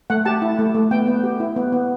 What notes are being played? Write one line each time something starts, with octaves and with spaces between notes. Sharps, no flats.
A3 F#5
G4 A5
E4
A3
A3
B3 G5
B3
G4
E4
B3
B3